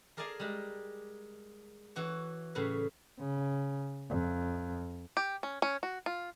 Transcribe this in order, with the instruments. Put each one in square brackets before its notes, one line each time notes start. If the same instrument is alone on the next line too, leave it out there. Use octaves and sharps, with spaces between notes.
[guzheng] G#4 A#4 D5 F5 G#5 A5
G3 G#3
E3 F#4 C#5
A2 C#3 B4
[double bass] C#3
F2
[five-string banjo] G4
C#4
C#4
F#4
F4